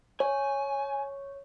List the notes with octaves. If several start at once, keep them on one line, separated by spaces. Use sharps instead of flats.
C#5 G#5